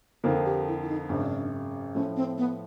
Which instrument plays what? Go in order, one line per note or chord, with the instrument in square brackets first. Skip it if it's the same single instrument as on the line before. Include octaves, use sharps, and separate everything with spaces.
[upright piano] F2 D3 F3 A#3 [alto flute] D#4
[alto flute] G4
E4
E4
D#4
[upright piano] G#1 F#2 C#3 [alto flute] D4
[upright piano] A2 F3 A3 [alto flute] C#4
[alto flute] C4
B3